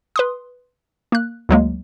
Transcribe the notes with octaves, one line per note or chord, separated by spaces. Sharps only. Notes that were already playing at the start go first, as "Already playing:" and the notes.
B4 C6 D#6
A#3 F#6
D2 F#3 G#3 A#3